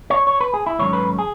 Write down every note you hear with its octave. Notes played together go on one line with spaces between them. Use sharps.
C#5
C#5
B4
G#4
E4
G#2 D#3 F#3 A3 C#4 C#5
B4
G#4